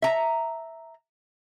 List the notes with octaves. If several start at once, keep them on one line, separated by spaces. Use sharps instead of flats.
E5 A#5